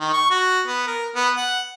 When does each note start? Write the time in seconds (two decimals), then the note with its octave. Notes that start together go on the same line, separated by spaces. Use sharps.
0.01 D#3
0.13 C#6
0.31 F#4
0.68 B3
0.87 A#4
1.15 B3
1.36 F#5